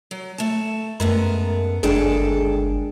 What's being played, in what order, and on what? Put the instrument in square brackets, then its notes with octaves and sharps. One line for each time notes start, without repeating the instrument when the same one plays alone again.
[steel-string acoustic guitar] F#3
A3 A5
[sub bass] F#2 [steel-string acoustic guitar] G#3 A3 B3 [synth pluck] A#4
[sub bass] G1 [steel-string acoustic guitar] D#2 A4 G5 [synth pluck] G#3 D4 G#4